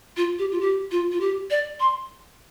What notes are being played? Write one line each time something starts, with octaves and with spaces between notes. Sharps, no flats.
F4
G4
F4
G4
F4
F4
G4
D5
C6